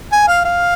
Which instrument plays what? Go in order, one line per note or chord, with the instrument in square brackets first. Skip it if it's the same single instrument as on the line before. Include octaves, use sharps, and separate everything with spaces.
[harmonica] G#5
F5
F5